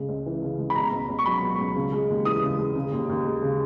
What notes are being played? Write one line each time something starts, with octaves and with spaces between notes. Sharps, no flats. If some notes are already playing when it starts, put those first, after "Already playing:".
Already playing: C#3 G#3
C#2
E3
C#3
G#3
B5
B2 A#5
C#2
C#2
C#6
F#3 B5
B2
C#2
C#3
G#3
D#2
E3 D#6
C#3
G#3
C#3
D#2
D#2
G#3
C#3